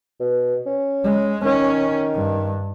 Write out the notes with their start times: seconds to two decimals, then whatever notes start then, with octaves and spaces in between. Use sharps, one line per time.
0.20 B2
0.66 C#4
1.04 G#3
1.45 D#3 C#4
2.14 G2